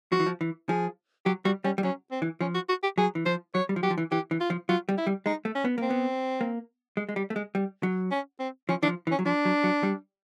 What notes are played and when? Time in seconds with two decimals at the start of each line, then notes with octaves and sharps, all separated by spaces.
0.12 F3 F#4
0.20 E3
0.27 F3
0.41 E3
0.69 F3 G#4
1.26 F#3 G4
1.45 G3 F#4
1.64 G3 C#4
1.78 G3
1.83 F#3 C#4
2.11 C4
2.22 E3
2.41 F3 C#4
2.55 F#4
2.69 F#4
2.83 G4
2.98 F#3 G#4
3.15 E3
3.26 F3 C5
3.55 F#3 C#5
3.69 G3
3.76 F3
3.83 F#3 G4
3.90 F3
3.98 E3
4.12 E3 G4
4.31 E3
4.41 F4
4.50 F3
4.69 F#3 F4
4.89 G3
4.98 E4
5.07 G3
5.26 G#3 D#4
5.45 A3
5.55 C#4
5.65 B3
5.78 A#3 C4
5.90 B3
6.41 A#3
6.97 G#3
7.09 G#3
7.16 G3
7.30 A3
7.36 G#3
7.55 G3
7.83 F#3
8.11 C#4
8.40 C4
8.69 F3 C#4
8.83 E3 D4
8.88 F3
9.07 E3
9.11 C#4
9.19 F#3
9.26 F3 D4
9.45 F#3
9.64 F#3
9.83 G3